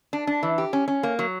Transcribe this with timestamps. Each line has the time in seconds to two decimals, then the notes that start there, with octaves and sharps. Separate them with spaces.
0.13 D4
0.27 D4
0.43 E3
0.58 G4
0.73 C#4
0.88 C#4
1.03 A#3
1.19 F#3